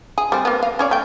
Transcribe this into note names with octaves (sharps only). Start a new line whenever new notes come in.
G#4
G3 A3 C4
A#3 B3
F5
C#4 C#5 D5
A3 G5